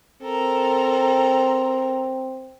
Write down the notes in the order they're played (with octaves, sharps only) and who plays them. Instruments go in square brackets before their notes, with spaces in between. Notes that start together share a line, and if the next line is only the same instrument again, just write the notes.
[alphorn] C4 [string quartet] A4 A#4 A#5